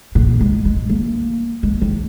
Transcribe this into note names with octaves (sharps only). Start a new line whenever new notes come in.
A#2
G#3
G#3
A#3
G#3
D#3